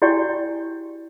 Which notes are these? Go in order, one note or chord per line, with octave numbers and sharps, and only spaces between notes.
E4 F#4 G4 D5 G5 G#5